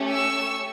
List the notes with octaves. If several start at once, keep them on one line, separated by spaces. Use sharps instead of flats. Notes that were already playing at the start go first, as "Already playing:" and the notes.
Already playing: A3 C#4 G4
C#6 E6